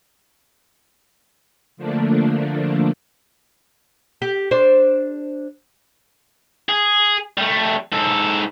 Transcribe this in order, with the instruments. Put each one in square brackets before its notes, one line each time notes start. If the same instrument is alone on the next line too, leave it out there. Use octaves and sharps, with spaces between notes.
[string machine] D3 F3 A3 A#3 D4
[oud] G4
D4 C5
[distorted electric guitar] G#4
G3 A3
G#2 A4